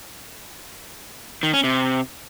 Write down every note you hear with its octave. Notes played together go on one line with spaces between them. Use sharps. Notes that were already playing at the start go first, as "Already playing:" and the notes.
D#3
C#4
C3